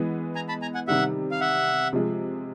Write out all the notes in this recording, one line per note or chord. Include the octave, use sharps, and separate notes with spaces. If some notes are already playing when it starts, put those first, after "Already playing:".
Already playing: E3 G#3 B3
G#5 A#5
A5 B5
G#5 A#5
F#5 G#5
C3 D#3 G3 E5 F#5
F5
E5 F#5
C3 F3 G#3